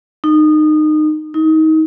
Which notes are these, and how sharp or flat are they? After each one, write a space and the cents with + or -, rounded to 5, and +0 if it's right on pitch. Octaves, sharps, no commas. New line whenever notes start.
D#4 -25
D#4 +25